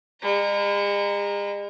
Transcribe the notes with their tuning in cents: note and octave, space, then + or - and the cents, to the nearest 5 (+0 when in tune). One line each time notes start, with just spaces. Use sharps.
G#3 -45 A#5 +0